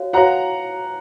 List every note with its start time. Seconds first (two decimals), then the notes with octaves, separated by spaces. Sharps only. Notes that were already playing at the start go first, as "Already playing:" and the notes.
Already playing: F#4 C#5 F5
0.13 F#4 C#5 F5 F#5 A#5